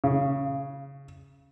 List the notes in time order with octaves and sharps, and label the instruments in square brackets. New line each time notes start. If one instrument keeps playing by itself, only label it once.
[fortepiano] C#3